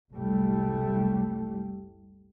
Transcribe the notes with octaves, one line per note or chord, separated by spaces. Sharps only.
F#1 C2 A2 G3 A3